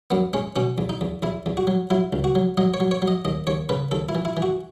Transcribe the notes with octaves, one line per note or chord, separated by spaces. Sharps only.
F#2 B3
G#3 C#4
B2 C#4
E2
D#4
E2
E2 E4
E2
F#4
F#3
F#3 E4
C#2
F#4
F#3
F#3 D#5
C#5
F#3
C#5
F#3
D#5
D#2 D#5
D#2 C#5
C#3 B4
D#2 A4
E4
E3
E4
E3
F#4